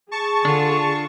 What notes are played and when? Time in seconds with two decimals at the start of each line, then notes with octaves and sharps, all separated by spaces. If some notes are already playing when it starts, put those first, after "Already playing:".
0.11 G#4 A5 C#6
0.45 D3 D4 F4